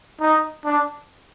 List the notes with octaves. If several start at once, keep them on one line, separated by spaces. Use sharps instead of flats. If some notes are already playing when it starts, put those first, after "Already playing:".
D#4
D4